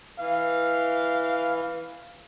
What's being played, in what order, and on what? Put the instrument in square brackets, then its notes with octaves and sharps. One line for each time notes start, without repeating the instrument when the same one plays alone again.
[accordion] E3 [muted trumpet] F5